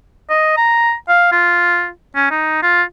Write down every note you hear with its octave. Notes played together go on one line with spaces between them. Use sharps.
D#5
A#5
F5
F4
C#4
D#4
F4